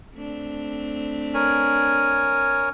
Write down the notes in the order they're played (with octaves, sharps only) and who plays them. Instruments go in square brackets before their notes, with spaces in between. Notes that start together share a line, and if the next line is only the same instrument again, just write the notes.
[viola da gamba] A3 C4 D4
[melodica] A#4 C#5 G#5